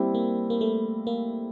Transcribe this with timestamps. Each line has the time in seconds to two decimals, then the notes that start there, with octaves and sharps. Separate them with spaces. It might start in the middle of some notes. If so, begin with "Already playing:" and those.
Already playing: G3 A#3 C4 E4
0.15 A#3
0.50 A#3
0.61 A3
1.07 A#3